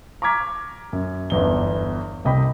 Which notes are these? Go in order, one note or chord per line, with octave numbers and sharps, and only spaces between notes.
A#5 C#6 D6 F6 G#6 B6
F#2
G1 E2 G7
C2 C3 D#5 G5 B5